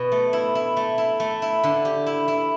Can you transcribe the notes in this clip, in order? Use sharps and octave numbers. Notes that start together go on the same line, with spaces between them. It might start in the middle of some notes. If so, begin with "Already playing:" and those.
Already playing: B2
A3
E4
E4
A3
E4
A3
E4
D3
G4
E4
E4